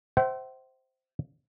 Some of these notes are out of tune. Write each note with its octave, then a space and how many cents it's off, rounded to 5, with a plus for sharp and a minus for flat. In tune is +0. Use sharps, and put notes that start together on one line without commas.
C5 +0 E5 +0 G5 -45